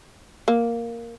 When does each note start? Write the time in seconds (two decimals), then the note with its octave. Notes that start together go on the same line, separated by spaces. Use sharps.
0.48 A#3